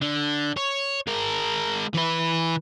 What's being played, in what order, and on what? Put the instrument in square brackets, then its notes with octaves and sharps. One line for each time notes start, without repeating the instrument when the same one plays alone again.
[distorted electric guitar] D3
C#5
G#3 A#4
E3 B4